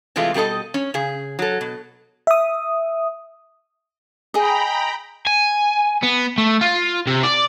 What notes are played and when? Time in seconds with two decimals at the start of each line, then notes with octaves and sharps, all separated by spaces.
0.16 C3 E3 G#3 A3 F4
0.34 B2 G3 G#4 A4 D#5
0.74 C#4
0.94 C#3 G#4
1.39 F#3 A4
1.61 B2
2.27 E5 D#6
4.34 G#4 D#5 G5 A#5 B5
5.27 G#5
6.03 B3
6.38 A3
6.61 F4
7.07 C3
7.23 D5